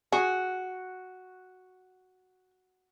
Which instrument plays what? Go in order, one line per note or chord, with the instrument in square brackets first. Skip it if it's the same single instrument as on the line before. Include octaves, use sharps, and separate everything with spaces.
[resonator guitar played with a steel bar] F#4 [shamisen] G#4